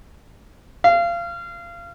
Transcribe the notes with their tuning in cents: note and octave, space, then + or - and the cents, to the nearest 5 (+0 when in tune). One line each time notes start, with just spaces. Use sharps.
F5 -25